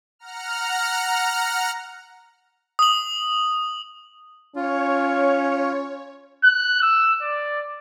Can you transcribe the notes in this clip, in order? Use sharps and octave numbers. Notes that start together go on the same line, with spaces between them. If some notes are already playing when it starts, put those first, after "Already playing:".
F#5 A#5 F6
D#6 F#7
C#4 F4 C#5
F#6
E6
D5